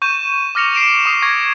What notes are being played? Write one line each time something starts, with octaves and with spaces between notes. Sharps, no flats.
C#6 G6 D#7 E7
D6 F6 A#6 C#7 F7
C7 D7 E7 F7
C#6 D#6 C7
C#6 G#6 A#6